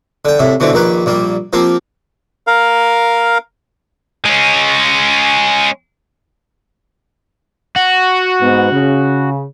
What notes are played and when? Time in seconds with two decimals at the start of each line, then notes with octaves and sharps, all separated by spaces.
0.25 D3 G5
0.39 C2 A2 E5
0.60 B2 D3 E3 C4
0.73 A#1 D#3 A#3 B4
1.06 A#1 G3 A#3
1.53 F3 A#3 C4 G4
2.47 A#4 F5
4.25 G#3 C#4
7.76 F#4
8.42 G#2 B3
8.72 C#3